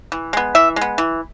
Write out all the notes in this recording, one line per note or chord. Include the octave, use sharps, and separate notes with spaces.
E3
G#3 B3
E3 E5
G#3
B3
E3